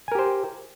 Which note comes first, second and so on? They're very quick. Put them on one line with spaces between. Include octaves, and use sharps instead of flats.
G#5 A#4 G4 C5